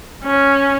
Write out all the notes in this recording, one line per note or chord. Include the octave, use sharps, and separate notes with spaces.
C#4